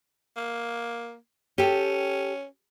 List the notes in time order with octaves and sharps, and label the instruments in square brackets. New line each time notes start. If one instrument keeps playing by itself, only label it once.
[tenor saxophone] A#3
[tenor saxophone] C#4 [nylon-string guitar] G4 A4